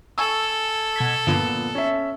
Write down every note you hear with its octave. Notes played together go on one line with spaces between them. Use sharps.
A4 G#5 C#6 E6
B2 G#6 B6
G2 A#2 D3 F3 B3
C#4 E5